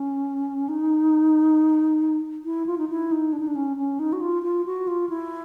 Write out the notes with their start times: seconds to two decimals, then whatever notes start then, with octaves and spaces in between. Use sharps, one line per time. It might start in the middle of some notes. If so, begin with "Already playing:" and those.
Already playing: C#4
0.69 D#4
2.45 E4
2.66 F4
2.78 D#4
2.90 E4
3.12 D#4
3.33 D4
3.40 D#4
3.48 D4
3.55 C#4
3.77 C#4
3.99 D#4
4.13 F#4
4.21 F4
4.43 F4
4.66 F#4
4.88 F4
5.09 E4